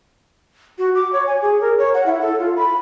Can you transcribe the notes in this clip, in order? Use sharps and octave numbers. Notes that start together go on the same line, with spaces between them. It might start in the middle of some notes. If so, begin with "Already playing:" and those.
F#4
D6
C#5
G#5
G#4
A#4
C#5
F#5
E4
A4
F4
B5